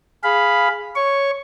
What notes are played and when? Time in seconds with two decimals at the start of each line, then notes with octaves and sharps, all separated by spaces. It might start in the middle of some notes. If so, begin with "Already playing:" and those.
0.24 G#4 F5 B5
0.96 C#5 C#6